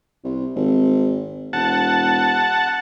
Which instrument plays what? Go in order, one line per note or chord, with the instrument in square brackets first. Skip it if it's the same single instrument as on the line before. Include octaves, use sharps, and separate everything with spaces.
[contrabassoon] C2
G#1
[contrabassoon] E1 [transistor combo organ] F#5 A5